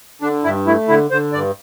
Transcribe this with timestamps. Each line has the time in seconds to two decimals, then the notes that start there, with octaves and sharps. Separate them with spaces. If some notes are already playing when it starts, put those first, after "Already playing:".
0.22 D3 D4
0.44 G2 E4
0.66 A3 E4
0.88 D3 E4
1.11 D3 C5
1.33 G2 D5